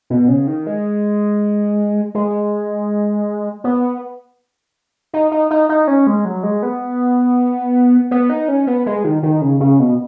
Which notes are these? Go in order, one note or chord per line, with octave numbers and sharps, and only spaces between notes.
B2
C#3
D#3
G#3
G#3
B3
D#4
D#4
D#4
D#4
C#4
G#3
F#3
G#3
B3
B3
D#4
C#4
B3
G#3
D#3
D#3
C#3
C#3
B2